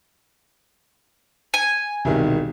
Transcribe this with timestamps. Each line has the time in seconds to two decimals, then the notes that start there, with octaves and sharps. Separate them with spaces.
1.54 G#5
2.05 E1 C2 D#3